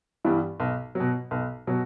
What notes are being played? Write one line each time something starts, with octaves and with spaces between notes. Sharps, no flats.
G2 E3 G3 B3
B1
B2 F#3
B1
B2 F#3